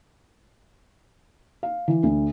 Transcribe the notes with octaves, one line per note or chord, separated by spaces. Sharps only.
F5
E3
D2